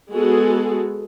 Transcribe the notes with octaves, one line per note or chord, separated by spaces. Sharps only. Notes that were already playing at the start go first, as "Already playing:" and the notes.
G#3 B3 F#4 G#4 A4